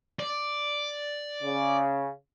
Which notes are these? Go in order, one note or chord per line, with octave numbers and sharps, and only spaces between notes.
D5
C#3